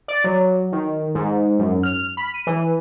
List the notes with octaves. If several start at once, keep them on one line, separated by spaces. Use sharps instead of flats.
D5
F#3
D#3
G#2
F#2
F6
B5
D#7
E3